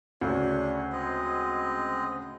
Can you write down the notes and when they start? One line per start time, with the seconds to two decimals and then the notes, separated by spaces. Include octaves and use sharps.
0.21 D2 C#3 D4 C#5
0.92 G#3 C4 D#5